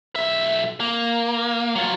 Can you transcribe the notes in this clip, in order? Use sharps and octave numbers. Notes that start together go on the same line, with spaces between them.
B1 E5
A#3
F#3 F4